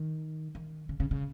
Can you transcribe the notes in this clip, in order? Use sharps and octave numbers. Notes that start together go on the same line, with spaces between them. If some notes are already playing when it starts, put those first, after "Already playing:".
Already playing: D#3
D#3
C#3
C#3
C#3